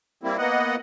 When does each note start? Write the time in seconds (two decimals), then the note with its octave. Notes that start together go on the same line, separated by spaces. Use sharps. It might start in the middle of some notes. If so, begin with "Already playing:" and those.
0.23 G3 A#3 C4 E4
0.38 A#3 B3 D#5 F#5